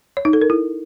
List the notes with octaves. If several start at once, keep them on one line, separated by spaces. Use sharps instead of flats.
C#5
D#4
A4
A#4
E4